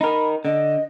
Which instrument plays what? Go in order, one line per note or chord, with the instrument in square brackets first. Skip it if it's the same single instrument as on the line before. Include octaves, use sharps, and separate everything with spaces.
[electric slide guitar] D#4 A#4 [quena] B5
[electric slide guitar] D3 [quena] D#5